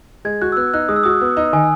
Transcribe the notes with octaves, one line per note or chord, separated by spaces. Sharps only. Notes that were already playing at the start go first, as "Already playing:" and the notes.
G#3 G#6
F#4 F#6
E6
B3 F#6
D#4 F#6
G#3 D#6
E6
F#4 D#6
B3
D#4
D#3 G#5